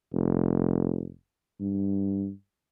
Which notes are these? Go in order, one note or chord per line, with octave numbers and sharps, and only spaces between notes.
F1
G2